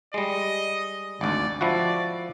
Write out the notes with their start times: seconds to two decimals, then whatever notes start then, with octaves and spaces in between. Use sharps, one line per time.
0.14 G3 G#3 D#5
1.21 G#1 D2 D5
1.61 F3 E4 F#4 D5